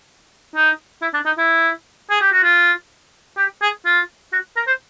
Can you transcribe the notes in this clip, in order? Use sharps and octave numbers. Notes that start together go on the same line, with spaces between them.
D#4
E4
D4
D#4
E4
G#4
G4
F#4
F4
G4
G#4
F4
F#4
A#4
C5